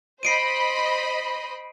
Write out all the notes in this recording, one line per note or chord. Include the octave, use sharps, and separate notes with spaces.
C5 D#5 B5 C7 D7 D#7